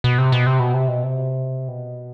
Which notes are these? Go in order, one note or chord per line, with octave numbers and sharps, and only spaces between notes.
B2
C3
B2
C3
B2
C3
B2
C3
B2